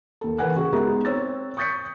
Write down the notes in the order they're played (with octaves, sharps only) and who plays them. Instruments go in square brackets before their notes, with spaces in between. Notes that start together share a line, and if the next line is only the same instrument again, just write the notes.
[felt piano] D#2 A4
E3 A#4 B4 F#5 G#5 F#6
C#3 F#4 G#4
G#3 B3 D#4 G4 A#4 E5
C4 C#5 E6 A6
C#6 D#6 G6 A6 B6 C#7